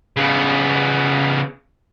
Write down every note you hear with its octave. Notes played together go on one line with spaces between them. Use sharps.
C#3 B3